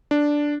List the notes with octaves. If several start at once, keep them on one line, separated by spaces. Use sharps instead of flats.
D4